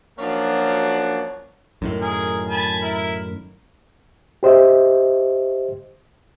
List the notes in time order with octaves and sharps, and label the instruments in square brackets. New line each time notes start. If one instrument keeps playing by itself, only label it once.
[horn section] F3 F#3 A#3 C#4 D4 F#4
[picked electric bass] F#2 A2 D#3
[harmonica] G#4 A#4
G#5 A5 B5
E4 A#4
[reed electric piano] G4 C5 D#5 E5